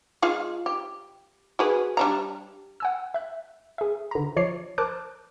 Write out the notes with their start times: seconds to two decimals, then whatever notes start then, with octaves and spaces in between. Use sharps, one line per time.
0.22 G#3 F4 F5
0.66 G4
1.59 F#4 G#4 B4
1.97 G3 D4 A#5
2.80 F#5 G#5 E6
3.14 E5 F#6
3.78 G#4 E5
4.11 D3 A#5
4.36 F3 C#5 D5 C7
4.78 A#4 C5 A5 D6 F#6